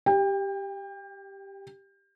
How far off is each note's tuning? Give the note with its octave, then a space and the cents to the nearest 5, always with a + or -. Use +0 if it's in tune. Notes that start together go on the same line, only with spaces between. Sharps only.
G4 +0 G5 +30